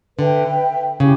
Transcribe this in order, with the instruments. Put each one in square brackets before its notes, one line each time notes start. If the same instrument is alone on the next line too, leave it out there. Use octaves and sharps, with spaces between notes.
[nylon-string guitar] D3 [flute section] B4 E5 G5
[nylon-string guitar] C#3 [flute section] E4 G4